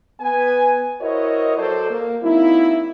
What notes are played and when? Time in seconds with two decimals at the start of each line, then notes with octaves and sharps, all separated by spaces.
0.21 B3 B4 G#5
1.01 E4 F#4 A#4 C5 C#5 D#5
1.58 F#3 A4 C5 D5
1.90 A#3
2.23 F#3 A#3 C4 D#4 E4